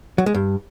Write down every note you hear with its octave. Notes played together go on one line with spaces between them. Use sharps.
F#3
G#3
G2